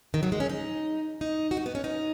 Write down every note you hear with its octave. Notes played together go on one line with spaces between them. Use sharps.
D#3
F#3
G#3
C#4
D#4
D#4
F#4
D#4
B3
C#4
D#4